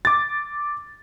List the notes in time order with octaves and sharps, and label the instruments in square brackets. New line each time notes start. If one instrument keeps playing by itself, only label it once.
[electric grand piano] D6 A6